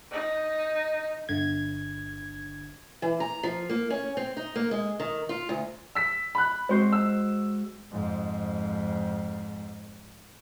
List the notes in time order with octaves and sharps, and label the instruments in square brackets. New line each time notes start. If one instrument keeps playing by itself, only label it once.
[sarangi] D#4
[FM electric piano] G1 D3 G#6
[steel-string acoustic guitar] E3
A#5
F3
A#3
C#4
C4
D#4
A#3
G#3
D#3
F4
D2
[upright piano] E6 B6
B5 F#6
[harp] G#3 F#4 C5 [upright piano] C4
[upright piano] E6
[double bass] F2 G#2